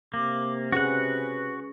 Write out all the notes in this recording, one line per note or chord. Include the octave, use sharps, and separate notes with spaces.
C3 A#3 D6
C#4 F#4 G#4 B4 F#5